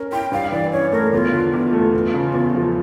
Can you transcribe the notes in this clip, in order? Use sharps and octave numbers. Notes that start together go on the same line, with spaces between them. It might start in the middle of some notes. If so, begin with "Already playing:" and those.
Already playing: C#4 A#4
E4 G5
G2 F5
E3 D5
C#4 C#5
A3 A#4
E2 F4
D3
E2 F4
A3
E2
C#3
E2
F3